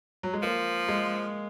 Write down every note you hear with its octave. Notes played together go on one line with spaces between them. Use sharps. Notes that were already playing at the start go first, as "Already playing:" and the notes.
F#3
G#3
F3 A#3
G#3